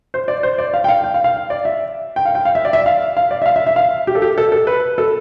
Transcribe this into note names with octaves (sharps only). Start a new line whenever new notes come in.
C5
D5
C5
D5
F5
G5
F5
G5
F5
F5
D5
E5
G5
F5
G5
F5
E5
D5
E5
F5
F5
D5
E5
F5
E5
E5
F5
G4
A4
G4
A4
A4
B4
A4